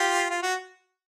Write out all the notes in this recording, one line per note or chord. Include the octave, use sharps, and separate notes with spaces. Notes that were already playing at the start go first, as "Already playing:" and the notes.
Already playing: F4 G4
F4
F#4